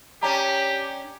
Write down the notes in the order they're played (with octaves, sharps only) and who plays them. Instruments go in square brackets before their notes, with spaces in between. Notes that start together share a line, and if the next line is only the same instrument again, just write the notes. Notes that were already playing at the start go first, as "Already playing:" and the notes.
[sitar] C#4 D4 [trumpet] G4 [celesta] A#5